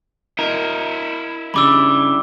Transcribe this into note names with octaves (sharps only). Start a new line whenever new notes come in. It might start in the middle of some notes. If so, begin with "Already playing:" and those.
E4 A#4 D#5
G2 C#3 G3 B5 D6 E6